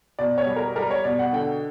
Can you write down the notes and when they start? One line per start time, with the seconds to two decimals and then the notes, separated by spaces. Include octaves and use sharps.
0.19 B2 D5
0.38 C#5
0.47 G3
0.56 A#4
0.76 G3 A#4
0.91 C#5
1.04 B2 D5
1.19 F#5
1.33 D3 G5